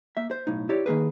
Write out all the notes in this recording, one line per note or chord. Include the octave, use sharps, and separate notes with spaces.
A#3 E5
C5
B1 A2 D#4
E4 G4 C#5 D5
D#3 A#3 G#4 B4